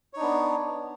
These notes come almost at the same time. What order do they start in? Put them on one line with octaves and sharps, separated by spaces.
C#5 D#4 D4 B3